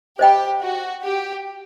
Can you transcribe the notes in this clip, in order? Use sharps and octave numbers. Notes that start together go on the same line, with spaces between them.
G4 C5 D#5 G5 B5
F#4
G4